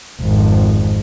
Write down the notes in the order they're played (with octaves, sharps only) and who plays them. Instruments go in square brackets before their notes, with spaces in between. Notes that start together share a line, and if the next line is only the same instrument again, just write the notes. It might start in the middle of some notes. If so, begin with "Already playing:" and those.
[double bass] G#1 F2